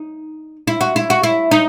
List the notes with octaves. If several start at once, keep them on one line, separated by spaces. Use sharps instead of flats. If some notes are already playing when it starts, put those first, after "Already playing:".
Already playing: D#4
E4
F#4
E4
F#4
E4
D#4